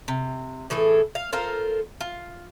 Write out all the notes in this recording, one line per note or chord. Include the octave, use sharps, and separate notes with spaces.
C3
A2 E3 G#4 A4
F5
F4 A4 A#4 C5
F4